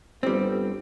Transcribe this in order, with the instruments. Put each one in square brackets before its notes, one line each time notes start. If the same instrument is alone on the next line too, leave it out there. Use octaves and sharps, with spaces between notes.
[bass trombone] G1 [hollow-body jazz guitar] G3 C4